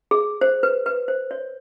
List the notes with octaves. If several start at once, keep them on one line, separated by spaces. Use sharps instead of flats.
G#4
C5
B4
B4
C5
C#5